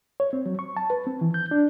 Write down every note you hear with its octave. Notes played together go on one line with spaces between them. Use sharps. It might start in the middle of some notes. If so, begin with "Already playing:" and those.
C#5
C4
F#3
C#6
A5
B4
C4
E3
G6
D4